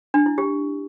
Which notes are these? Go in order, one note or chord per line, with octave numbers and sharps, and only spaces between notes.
D4
E4
G4